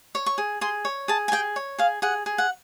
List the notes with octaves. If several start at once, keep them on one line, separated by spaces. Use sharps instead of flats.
C#5
C#6
G#4
G#4 C6
C#5
G#4 A5
G#5
G#4 G5
C#5
G#4 F5
G#4 F#5
G#4
F#5